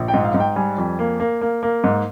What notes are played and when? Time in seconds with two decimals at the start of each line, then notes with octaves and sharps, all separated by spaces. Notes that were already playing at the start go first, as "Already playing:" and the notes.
Already playing: A#1
0.08 G5
0.14 G#2
0.24 F5
0.34 G#2
0.40 G5
0.56 G3 G#5
0.78 F2
0.99 A#3
1.20 A#3
1.41 A#3
1.63 A#3
1.84 G#2